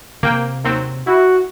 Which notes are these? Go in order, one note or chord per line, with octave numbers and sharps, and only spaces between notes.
C3 A#3 G5
D#2 F#3 C4
E4 F#4